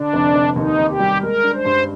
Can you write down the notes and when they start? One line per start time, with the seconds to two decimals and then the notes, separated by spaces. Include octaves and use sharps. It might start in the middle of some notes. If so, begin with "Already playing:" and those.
Already playing: D3 D4
0.13 F1
0.35 F1
0.56 D#2 D#4
0.79 D#2
0.89 G4
0.99 G3
1.22 G#3 A#4
1.44 D4
1.55 C5
1.65 G2